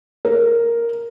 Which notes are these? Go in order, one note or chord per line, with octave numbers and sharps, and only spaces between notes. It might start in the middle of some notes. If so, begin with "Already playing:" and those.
A#4